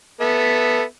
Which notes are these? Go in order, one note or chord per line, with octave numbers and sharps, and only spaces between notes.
B3 A4 E5